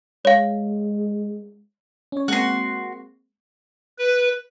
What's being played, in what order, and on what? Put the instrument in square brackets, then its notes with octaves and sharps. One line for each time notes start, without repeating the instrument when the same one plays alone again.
[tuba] G#3 [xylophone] C#5 F5
[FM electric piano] C#4 C#5
[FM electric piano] G#3 A#3 C4 [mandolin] F#4 C6
[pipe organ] B4